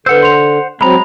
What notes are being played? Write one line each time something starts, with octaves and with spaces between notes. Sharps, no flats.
D3 B4 C5 F#5 E6
C6 F7
F#3 G#3 C4 A#5 B5